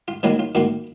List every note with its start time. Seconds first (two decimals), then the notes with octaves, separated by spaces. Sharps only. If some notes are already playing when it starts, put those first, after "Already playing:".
0.08 F4
0.23 D#3 F#3 A#3 D#4 F4
0.39 F4
0.55 D#3 A#3 F4 F#4